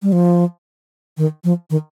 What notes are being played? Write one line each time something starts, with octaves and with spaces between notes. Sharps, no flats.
G3
F3
D#3
F3
D#3